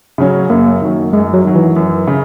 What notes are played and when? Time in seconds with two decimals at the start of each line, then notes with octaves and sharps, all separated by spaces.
0.18 C#3 F#3 C#4
0.50 F#2 A#3
0.82 D#3 F#3
1.13 F#2 G#3
1.34 F#3
1.45 D#3 F#3
1.56 E3
1.76 F#2
2.08 C#3